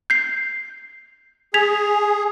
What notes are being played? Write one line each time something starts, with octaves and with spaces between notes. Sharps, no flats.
G6 C7
G#4 G#5 G#6 B6 F7